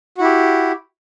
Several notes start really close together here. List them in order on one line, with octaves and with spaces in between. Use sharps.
F#4 E4 G4